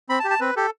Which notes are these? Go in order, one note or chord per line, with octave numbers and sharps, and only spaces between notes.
C4 B5
A5
G4
A5
C4 B4
G4 A4